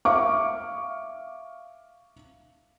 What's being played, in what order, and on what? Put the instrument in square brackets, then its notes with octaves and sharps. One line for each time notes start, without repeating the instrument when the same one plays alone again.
[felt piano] E5 F5 C#6 D6